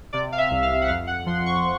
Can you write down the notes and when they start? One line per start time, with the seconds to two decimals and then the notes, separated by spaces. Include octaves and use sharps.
0.13 C3 D5
0.32 F5
0.38 E5
0.51 C2
0.63 F5
0.82 F#5
0.88 F2 F5
1.07 F#5
1.26 F3 C6
1.46 C#6